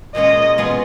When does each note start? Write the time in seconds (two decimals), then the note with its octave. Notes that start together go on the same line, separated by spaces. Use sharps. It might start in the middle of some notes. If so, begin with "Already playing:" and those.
0.15 A#2 G#3 C#4 F4 D#5
0.58 B2 G#3 B3 F4 G#4